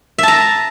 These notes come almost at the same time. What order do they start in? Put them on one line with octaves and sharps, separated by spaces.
E5 A5 A#5